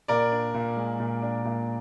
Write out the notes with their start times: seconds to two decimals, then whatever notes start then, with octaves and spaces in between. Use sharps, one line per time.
0.08 A#2 A#4 D5
0.32 D4
0.54 A#2
0.76 G#3
1.00 A#2
1.22 D4
1.45 A#2